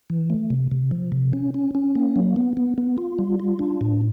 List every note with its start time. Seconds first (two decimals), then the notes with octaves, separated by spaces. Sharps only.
0.10 E3
0.30 A3
0.50 C3
0.71 C3
0.91 F3
1.12 C3
1.33 C#4
1.54 C#4
1.75 C#4
1.95 A#3
2.16 F#3
2.36 B3
2.57 B3
2.78 B3
2.98 F4
3.19 G3
3.40 F4
3.59 D4
3.81 A2